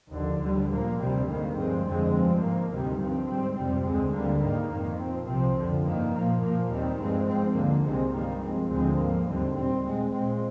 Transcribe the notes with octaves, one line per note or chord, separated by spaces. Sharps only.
D#2 D3 F3
D2 D3 G3
A#2 F3 A#3
D2 C3 G3 C4
G#2 D#3 A#3
G2 F3 G#3 C4
F2 D3 G#3 C4
G2 F3 C4
G#2 F3 A#3
D2 C3 D#3 G3
G2 F3 C4
G#2 G3 C4
F2 C3 G3 C4
D2 D3 G#3 C4
D2 D3 G3 A#3
G#2 D#3 A#3
F2 D#3 A#3
A#2 F3 C4
C2 C3 F3 C4
F2 D3 F3
G2 D#3 A#3
A#2 F3 A#3
A#2 F3 A#3
D#2 D#3 G3 C4
G2 F3 G#3 C4
G#2 F3 C4
D#2 D3 F3 A#3
C2 C3 D#3 G#3 C4
G2 D#3 G3 A#3
G2 F3 G#3 C4
D2 D3 F3 G#3 C4
G#2 F3 A#3
D#2 D3 G3 C4
A#2 G3 C4
A#2 G#3 C4
A#2 G#3 C4